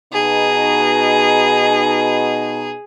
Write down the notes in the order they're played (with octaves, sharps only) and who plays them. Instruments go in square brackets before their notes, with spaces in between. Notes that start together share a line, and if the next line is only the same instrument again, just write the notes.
[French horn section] B2 D#4 [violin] G#4